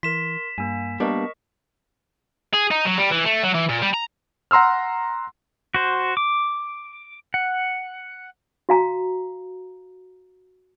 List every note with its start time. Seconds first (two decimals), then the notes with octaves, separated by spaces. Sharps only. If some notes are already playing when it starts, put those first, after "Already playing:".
0.03 E3 A#4 C6 B6 E7
0.58 G2 A#3 G#5
1.00 G3 A#3 B3 D4 A#4 D#5 C#6
2.53 G#4
2.71 D#4
2.85 F#3
2.98 G3
3.11 E3
3.25 A3
3.43 F#3
3.54 E3
3.69 A#2
3.82 G3
3.94 A#5
4.51 F#5 A#5 C6 E6 F6
5.74 F#4 C5
6.17 D6
7.34 F#5
8.69 F#4 F5 A#5